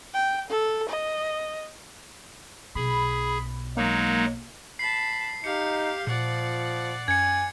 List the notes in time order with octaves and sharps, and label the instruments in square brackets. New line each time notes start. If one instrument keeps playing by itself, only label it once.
[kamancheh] G5
A4
D#5
[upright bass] B1 B2 [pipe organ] G#4 [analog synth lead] B5
[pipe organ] F#3 G#3 D#4 [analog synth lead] A#3
[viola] A5 B5 [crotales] C7
[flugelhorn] D#4 [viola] G4 F5 [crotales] C#7
[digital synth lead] A#2 [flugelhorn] F3 [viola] D5 F#5
[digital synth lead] F#2 [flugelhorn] G#5 [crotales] G#6 C#7